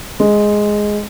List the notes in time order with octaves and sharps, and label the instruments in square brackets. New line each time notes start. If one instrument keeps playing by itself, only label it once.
[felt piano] G#3